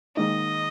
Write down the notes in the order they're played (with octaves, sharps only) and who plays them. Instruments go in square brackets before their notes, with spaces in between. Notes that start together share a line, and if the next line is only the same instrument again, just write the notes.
[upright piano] G#2 D#3 A#3 D#4 [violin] D#5